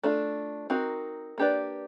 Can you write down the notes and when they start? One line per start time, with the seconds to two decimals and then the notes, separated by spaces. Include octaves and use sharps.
0.03 A3 D4 F4
0.70 C4 D#4 F#4 A#4
1.38 A#3 D4 G4 B4 D5